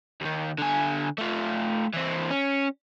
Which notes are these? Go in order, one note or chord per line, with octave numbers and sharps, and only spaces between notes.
D#2 D#3
D3 G#5
A3 F4
E3 C4
C#4